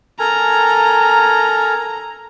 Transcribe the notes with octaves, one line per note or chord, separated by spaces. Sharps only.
A4 A#4 G#5 A#5